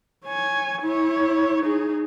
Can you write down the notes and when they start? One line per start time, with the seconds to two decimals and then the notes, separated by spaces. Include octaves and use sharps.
0.25 C#5 G#5
0.82 E4 C#5
1.63 D#4 G#4